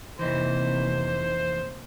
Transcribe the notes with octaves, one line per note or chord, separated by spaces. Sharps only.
F1 C3 E3 A#3 D#4 E4 C5